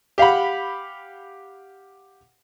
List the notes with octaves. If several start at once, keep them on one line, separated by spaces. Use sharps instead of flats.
G4 F5 F#5 B5